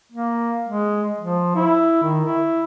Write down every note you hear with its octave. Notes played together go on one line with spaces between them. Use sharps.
A#3
G#3
F3
E4
D#3
E4